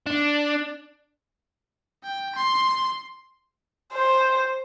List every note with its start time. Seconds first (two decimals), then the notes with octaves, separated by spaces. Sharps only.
0.07 D4
2.04 G5
2.35 C6
3.94 C5